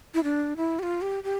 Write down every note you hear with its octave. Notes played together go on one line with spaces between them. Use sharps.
E4
D4
E4
G4
F4
G4
G4